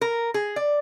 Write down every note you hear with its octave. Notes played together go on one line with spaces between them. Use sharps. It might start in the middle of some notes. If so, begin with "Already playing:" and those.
A#4
G#4
D5